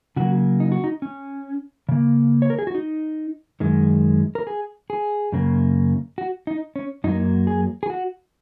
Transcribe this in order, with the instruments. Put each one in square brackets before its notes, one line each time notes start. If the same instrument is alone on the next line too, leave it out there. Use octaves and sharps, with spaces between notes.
[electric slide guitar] C#3 F#3 A#3 F#4
D#4
F#4
D#4
C#4
C#3 A#3
C#5
A#4
G#4
F#4
D#4
F#2 D#3 G#3
A#4
G#4
G#4
F#2 C#3 A#3
F#4
D#4
C#4
F#2 F#3 A#3 D#4
G#4
G#4
F#4